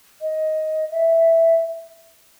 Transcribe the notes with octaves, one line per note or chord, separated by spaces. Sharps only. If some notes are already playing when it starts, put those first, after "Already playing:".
D#5
E5